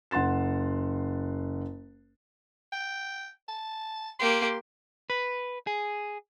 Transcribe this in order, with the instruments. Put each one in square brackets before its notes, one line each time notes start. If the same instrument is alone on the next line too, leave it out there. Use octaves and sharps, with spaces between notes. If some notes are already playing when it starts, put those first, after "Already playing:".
[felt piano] F#1 F#5 C6 A6 E7
[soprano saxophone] G5
A5
[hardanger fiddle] A#3 G4 [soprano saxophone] C6
[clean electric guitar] B4
G#4